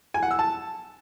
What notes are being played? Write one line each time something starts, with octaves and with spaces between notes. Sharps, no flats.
G#5
F#5
E6
A5